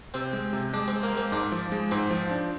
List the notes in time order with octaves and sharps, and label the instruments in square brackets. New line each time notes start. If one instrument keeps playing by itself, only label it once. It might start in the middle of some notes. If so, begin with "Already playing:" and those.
[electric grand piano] C3 [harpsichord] C4
[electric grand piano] G#3
C3
[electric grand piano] G#3 [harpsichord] D4
[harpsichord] C4
[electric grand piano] G#3
[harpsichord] A#3
[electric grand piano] G#3 [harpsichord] C4
[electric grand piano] G#2 [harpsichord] D4
[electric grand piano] F3
G#3
[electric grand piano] G#2 [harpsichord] C4
[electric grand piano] F3
D4